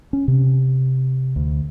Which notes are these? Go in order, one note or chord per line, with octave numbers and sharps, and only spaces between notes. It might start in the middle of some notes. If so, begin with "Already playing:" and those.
C#4
C3
D2